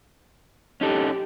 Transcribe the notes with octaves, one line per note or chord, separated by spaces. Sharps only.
C#4 D#4 G4 A4